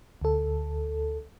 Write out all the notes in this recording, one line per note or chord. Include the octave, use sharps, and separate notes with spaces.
D2 A4